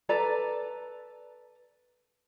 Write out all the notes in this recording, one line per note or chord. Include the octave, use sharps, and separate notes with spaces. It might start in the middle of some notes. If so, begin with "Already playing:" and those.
A4 B4 D5 A#5